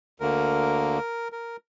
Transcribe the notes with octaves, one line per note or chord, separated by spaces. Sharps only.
D2 D3 A#3 A#4
A#4